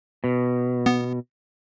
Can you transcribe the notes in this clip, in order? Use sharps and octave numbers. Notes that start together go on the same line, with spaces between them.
B2
B3